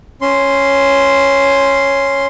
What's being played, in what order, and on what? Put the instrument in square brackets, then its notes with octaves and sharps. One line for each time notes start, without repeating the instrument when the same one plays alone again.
[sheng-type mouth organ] C#4 C6